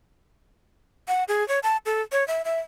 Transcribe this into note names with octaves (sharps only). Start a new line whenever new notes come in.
F#5
G#4
C#5
A5
A4
C#5
E5
E5